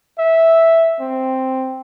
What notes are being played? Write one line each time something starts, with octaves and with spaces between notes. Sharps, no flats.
E5
C4